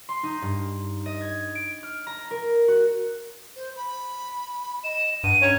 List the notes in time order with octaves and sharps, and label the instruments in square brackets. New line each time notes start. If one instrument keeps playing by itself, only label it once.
[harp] C6
D#4
G2
D#5
G#6
D7
F6
A#5
A#4
F#4
[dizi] C5
B5
[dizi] D#5 [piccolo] E7
[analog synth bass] G2 [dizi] F#5 [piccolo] D#7
[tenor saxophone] C#4 [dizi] A#5